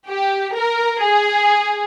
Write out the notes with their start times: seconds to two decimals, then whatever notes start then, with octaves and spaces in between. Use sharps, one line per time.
0.09 G4
0.56 A#4
1.03 G#4